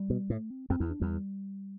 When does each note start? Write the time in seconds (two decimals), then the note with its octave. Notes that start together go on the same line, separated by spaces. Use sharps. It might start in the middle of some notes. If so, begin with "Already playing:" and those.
Already playing: G3
0.10 B2
0.30 A2 A3
0.50 C4
0.70 F2 C4
0.80 E2 E4
0.90 D4
1.00 E2 G3